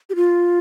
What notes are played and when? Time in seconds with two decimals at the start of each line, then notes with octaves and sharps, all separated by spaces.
0.10 G4
0.16 F4